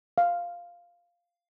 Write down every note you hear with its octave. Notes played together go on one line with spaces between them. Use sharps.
F5